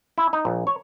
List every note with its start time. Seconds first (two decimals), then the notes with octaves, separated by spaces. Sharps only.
0.18 E4
0.33 D#4
0.45 A#1
0.67 C#5